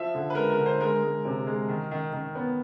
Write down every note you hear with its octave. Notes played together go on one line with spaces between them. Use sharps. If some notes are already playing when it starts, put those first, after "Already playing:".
Already playing: F3 E5
D3
B4
G#3 A#4
A#4
D3
C5
G#3 A#4
G#3
C3
G#3
D#3
D#3
D#3
B3